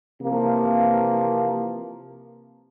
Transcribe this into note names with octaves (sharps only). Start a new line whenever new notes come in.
C3 E3 F3 A#3